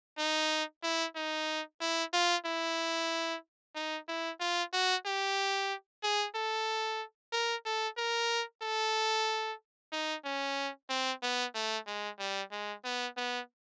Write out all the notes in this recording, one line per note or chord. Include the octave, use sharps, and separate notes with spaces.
D#4
E4
D#4
E4
F4
E4
D#4
E4
F4
F#4
G4
G#4
A4
A#4
A4
A#4
A4
D#4
C#4
C4
B3
A3
G#3
G3
G#3
B3
B3